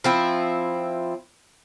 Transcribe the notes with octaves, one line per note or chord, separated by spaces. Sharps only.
F3 C4 E4